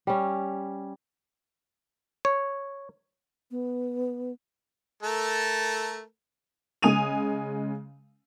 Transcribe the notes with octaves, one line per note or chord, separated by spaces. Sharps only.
G3 C#4
C#5
B3
A3 A4 A#4
C#3 G#3 G#5 D#6 D#7 F7